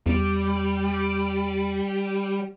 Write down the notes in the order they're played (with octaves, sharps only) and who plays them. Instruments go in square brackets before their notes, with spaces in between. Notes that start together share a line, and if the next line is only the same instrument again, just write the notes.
[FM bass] E2 [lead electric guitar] G3